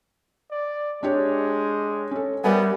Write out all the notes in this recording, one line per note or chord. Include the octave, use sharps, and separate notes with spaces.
D5
G#3 D4 G4 C#5
C#4 A4
G3 B3 A#4 E5 G#5